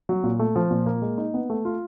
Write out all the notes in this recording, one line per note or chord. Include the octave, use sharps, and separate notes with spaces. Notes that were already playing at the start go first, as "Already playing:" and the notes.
F#3
A#2
A3
F3
A#2
A#3
G#3
D#4
B3
A3
F4